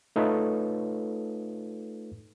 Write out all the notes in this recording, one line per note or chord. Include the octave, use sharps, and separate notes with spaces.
A3 D#4 F4 A4 B4 C#5